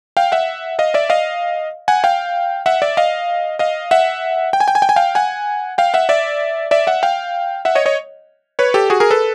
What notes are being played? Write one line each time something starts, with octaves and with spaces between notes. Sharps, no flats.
F5 G5
E5 F#5
D#5 F5
D5 E5
D#5 F5
F#5 G#5
F5 G5
E5 F#5
D5 E5
D#5 F5
D#5 F5
E5 F#5
G5
G#5
G5
G#5
G5
G#5
F5 G5
F#5 G#5
F5 G5
E5 F#5
D5 E5
D5 E5
E5 F#5
F5 G5
E5 F#5
C#5 D#5
C#5 D#5
B4 C#5
G4 A4
F#4 G#4
G#4 A#4
A4 B4